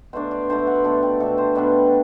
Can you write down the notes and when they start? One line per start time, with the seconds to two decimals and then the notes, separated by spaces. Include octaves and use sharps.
0.13 B2 A3 D4 C5
0.31 D5
0.49 B2 A3 D4 C5
0.59 E5
0.67 F#5
0.76 B4
0.84 B2 A3 D4 A4
1.03 G4
1.20 B2 A3 D4 A4
1.38 C5
1.55 B2 G3 B3 D4 B4